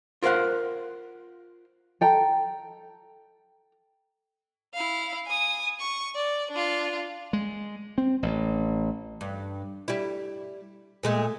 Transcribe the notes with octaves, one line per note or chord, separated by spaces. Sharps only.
F4 A#4 C5 F5 F#5
A4 G5 A#5
E4 F5
G#5 D#6
C#6
D5
D4 F4
G#3
C4
A1
G2
G3 E4
A#2 G#3 A3